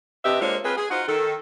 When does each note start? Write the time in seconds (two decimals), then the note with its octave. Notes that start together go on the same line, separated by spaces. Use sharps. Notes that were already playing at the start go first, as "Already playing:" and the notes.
0.25 C3 D4 G4 B4 D#5 E5
0.41 G#3 A#3 C4 D4 F4 C#5
0.64 C4 F4 G#4 B4
0.77 G#4
0.90 D#4 F4 F#4 C5 F#5
1.08 D#3 A4